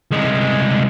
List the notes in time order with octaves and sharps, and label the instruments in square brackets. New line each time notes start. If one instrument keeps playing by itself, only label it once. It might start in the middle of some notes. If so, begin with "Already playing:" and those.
[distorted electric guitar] C2 G#3